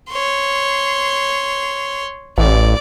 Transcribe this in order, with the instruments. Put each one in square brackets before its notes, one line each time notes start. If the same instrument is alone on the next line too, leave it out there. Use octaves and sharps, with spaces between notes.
[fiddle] C#5 C6
[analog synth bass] A1 [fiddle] D5